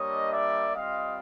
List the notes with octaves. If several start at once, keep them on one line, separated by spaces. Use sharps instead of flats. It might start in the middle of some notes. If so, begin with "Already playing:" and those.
Already playing: G3 A#3 D4 C#5 D#5
D5 E5
G3 C4 F4 D#5 F5